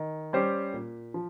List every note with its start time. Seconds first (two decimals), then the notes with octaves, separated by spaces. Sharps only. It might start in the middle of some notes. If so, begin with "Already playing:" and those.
Already playing: D#3
0.33 G3 C#4 G4 C5
0.74 A#2
1.14 F3